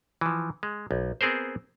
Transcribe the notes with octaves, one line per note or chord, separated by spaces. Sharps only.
E3 F3
G#3
B1
B3 C4 G#4 A#4 C5